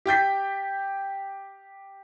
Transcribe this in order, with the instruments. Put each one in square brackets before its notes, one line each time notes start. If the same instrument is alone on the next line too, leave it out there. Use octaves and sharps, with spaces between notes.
[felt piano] G4 G5 G6 B6